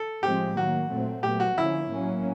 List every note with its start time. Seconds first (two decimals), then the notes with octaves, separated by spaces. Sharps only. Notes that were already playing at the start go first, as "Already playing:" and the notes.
Already playing: A4
0.23 A2 F3 G#3 C4 G4
0.57 D#3 F#3 A#3 F#4
0.90 A#2 F#3 A3 C4
1.23 A#2 F#3 B3 G4
1.40 F#4
1.57 D3 F3 A#3 C#4 E4
1.90 A2 F#3 A#3 C#4